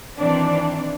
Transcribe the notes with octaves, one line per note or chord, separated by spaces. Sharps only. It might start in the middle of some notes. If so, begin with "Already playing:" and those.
D#3 E3 C4 D4 D5